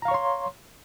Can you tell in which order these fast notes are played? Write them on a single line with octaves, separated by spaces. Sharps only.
A#5 F5 C#6 C#5 C6